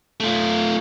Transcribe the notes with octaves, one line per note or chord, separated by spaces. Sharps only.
A3 F4